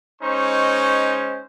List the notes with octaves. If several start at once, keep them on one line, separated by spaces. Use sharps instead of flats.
G#3 C#4 D#4 C5 C#6